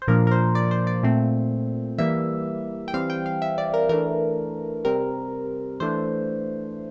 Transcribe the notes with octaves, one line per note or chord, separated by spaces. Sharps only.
C5
A#2 F3 A#3 D4 A#4
A#4
C5
D5
C5
D5
A#2 A3 C4
E3 G3 A#3 E5
G5
E3 G3 C4 F5
G5
F5
E5
D5
A#4
E3 A3 D4 A#4
C3 G3 C4 A#4
E3 A3 D4 C5